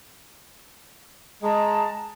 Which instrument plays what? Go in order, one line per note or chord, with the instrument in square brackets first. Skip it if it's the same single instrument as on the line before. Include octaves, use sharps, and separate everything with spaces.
[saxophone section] G#3 [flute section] A5 A#5